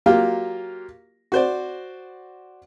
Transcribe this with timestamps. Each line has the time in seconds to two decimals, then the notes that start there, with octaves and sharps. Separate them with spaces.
0.06 F#3 A#3 F4 G4
1.32 F#4 C5 D5